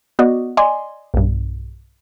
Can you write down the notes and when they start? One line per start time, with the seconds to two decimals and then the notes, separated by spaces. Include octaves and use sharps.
0.19 B3 F#4 D5 D#5
0.57 D5 D#5 G#5 C6
1.14 B1 G2